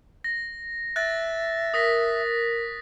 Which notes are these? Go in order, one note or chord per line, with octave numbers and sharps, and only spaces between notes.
A#6
E5 F#6 A6 A#6
A#4 D#6 A#6 B6